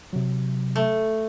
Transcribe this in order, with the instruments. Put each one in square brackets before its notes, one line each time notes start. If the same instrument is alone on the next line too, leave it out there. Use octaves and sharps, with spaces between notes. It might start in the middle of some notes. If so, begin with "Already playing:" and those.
[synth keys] C3 F#3
[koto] A3